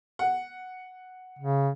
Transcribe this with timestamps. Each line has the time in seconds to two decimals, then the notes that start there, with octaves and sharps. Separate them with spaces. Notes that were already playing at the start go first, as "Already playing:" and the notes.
0.19 F#5
1.39 C#3